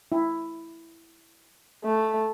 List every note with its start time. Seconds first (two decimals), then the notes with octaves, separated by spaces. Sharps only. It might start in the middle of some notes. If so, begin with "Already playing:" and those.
0.12 E4
1.84 A3